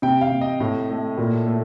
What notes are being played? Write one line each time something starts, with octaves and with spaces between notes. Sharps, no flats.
C3 G5
F5
C3
D#5
A2
A3
A#2
A3